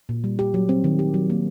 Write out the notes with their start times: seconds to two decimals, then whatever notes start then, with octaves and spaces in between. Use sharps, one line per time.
0.09 A#2
0.24 G3
0.39 G4
0.54 F#3
0.69 C4
0.84 D#3
0.99 G4
1.14 F#3
1.30 A#3